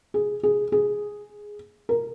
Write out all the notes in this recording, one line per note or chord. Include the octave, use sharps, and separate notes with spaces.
G#4
G#4
G#4
A#4